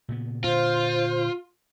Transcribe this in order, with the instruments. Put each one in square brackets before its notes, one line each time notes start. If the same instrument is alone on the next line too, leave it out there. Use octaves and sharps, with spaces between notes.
[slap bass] A#2 C#3 B3
[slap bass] A#2 D3 [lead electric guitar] F4 [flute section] C5